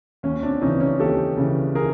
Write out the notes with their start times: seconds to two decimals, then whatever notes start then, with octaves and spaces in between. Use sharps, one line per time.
0.23 D#2 C#4
0.43 C4 D4
0.61 C#3 E3 C#4 D#4
0.80 C#4 D#4
0.99 D#2 G4 A4
1.37 C#3 E3
1.75 G#4 A#4